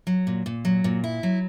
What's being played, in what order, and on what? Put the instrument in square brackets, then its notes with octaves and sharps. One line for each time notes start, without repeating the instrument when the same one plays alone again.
[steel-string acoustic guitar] F#3
A#2
A#2
F#3
A#2
E4
F#3